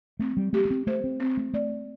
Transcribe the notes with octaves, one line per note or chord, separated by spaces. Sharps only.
A3 C4
G3
A3 G4
A3
C4
A3 C5
C4
C4
A3
A3 D5